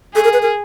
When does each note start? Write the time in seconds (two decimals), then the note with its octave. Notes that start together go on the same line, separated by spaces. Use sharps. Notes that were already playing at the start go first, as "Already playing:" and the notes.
0.15 G#4 A4
0.24 A#4
0.33 B4
0.42 A#4